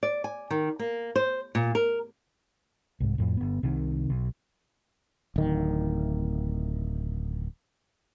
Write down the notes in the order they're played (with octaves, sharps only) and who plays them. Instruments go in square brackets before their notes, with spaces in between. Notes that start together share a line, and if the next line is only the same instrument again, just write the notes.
[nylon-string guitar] D5
G#5
D#3
A#3
C5
A#2
A#4
[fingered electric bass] C2 G#2
F2 A2
G1 B3
C2 C3 D#3
B1
[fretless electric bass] D1 D#3